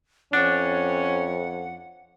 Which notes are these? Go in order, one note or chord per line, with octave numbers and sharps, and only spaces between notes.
F2 C#4 D4 F#5